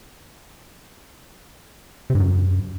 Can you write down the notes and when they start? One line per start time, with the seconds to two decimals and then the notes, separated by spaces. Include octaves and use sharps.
2.10 C3
2.15 G2
2.20 F#2